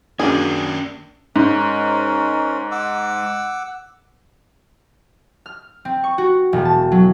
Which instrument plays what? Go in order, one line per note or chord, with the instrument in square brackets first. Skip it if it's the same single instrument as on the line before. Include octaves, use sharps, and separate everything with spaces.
[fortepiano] F#2 A#3 D4 [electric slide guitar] C#4 A#4 D5 [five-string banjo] G#4
[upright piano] G#2 [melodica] C#4 A#4
[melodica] F#5 D6 E6
[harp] F6
C4
C#6
F#4
E1
A5
F#3